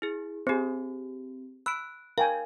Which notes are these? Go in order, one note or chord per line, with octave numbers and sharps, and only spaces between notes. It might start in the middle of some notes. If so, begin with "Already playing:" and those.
E4 G#4
C4 G4 G#4 C5
B5 E6 F#6 D7
A#4 F5 G5 G#5